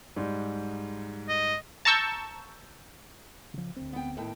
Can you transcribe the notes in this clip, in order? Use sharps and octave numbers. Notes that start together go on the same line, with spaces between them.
G#2 G3 G#3
D#5
A5 A#5 C#6 E6 G6
C#3 F3
D2 G#3 C4
B3 G5
D#2 A2 G5